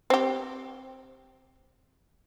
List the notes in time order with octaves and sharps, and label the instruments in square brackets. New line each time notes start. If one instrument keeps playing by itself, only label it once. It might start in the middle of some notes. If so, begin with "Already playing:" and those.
[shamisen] C4 G4